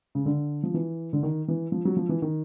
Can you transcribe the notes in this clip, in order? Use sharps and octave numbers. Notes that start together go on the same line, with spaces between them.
C#3
D3
F3
E3
D3
D#3
E3
F3
F#3
F3
E3
D#3